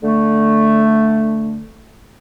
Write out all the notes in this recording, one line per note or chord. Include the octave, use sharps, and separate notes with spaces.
D3 A3